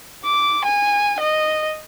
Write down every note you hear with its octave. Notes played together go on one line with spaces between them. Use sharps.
D6
G#5
D#5